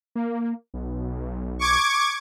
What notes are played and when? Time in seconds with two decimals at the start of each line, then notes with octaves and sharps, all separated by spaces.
0.15 A#3
0.74 B1
1.59 C#6 D6 G#6